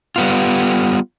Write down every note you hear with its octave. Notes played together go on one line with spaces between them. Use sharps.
G3 B3 F4